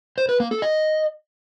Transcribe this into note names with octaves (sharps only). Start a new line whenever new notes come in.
C5
B4
A#3
A4
D#5